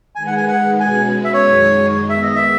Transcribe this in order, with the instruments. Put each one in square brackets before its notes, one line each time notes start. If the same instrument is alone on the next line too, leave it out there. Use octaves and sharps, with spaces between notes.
[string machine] D#3 G#3 D#4 G#4 B4 [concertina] G#5
[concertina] F#5
G#5
F#5
[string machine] B2 G#3 C#4 F#4 B4 [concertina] G#5
[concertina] E5
C#5
[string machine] F#2 D#3 G#3 D#4 G#4
[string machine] D#3 G#3 B3 [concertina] E5
[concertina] D#5
E5